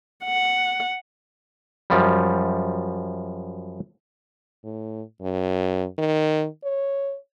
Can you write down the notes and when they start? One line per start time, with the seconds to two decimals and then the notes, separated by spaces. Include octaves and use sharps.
0.24 F#5
1.90 F#2 F3 G3
4.64 A2
5.22 F#2
5.99 D#3
6.64 C#5